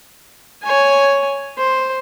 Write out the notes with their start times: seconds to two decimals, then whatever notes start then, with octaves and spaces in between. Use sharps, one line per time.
0.63 C#5 G#5
1.58 C5